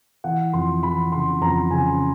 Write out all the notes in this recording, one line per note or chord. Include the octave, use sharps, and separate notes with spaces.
E3 F#5
F2 C6
E3 B5
C#3 C6
F2 A#5
C#3 G#5